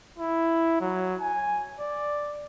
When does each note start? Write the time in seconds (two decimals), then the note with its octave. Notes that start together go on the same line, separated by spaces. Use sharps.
0.18 E4
0.81 F#3
1.21 G#5
1.80 D5